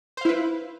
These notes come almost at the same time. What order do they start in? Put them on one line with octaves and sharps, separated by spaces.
C5 F5 E4 B4